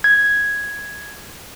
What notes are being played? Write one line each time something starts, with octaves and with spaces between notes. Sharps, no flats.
G#6